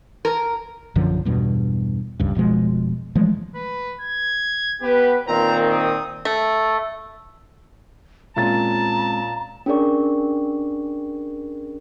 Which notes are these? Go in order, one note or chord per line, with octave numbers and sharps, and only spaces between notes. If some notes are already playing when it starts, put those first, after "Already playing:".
A#4
A#1 F#2 D3 F3
E2 G2 B2
D#1 C#2 G2
F1 B2 F3 G#3
E3 F3 G#3 A3
B4
G#6
B3 G4 B4
A#2 D#3 C4 A#5
D#6
A3
A#2 G#3 C4 C#4 A5 A#5 A6
C#4 D4 G#4 A#4 D5 C#6